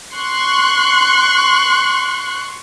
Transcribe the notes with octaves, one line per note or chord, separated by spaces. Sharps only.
C6 C#6 F#6